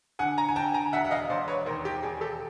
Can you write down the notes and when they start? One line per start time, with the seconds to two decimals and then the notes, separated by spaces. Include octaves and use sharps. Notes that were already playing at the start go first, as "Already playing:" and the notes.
0.19 D3 F#5 G#5
0.38 G#5 A#5
0.48 G#5
0.56 D3 G5 A5
0.74 G#5 A#5
0.93 E1 E5 F#5
1.05 F#5
1.11 D#5 F5
1.30 E1 C5 D5
1.48 B4 C#5
1.66 D#2 A#4 C5
1.85 G4
2.03 E1 G#4
2.21 G4 A4